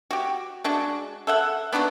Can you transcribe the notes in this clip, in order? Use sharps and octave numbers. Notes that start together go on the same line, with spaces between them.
F#4 G4
G#3 D4 F#4
A4 E5 F#5
B3 D4 D#4 F#4